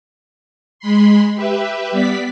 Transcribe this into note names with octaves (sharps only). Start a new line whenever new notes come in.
G#3 B5 C6
G4 B4 E5
G3 B3 D5 B6